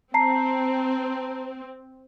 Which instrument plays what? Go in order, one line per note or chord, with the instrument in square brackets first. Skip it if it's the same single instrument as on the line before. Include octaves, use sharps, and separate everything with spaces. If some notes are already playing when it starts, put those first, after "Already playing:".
[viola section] C4 [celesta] A5 A#5 C7